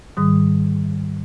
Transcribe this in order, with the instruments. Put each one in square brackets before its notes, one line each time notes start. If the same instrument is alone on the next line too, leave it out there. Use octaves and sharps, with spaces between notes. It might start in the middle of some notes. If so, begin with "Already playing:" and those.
[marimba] G#2 D#3 G3 D#6